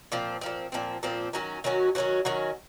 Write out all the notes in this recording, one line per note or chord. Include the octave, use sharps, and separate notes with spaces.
A#2 F3 C4
A#2 F3 C4
A#2 F3 C4
A#2 F3 C4
D#3 F#3 C#4 F#4
D#3 F#3 C#4 F#4
D#3 F#3 C#4 F#4
D#3 F#3 C#4 F#4